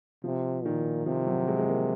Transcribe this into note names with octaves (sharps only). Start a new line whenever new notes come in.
C3 F3
A#2 D#3
C3 F3
F#3
G#3
G#3
A#3